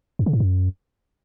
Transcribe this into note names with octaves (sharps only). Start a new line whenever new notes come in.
F#2
C#3
G#2
F#2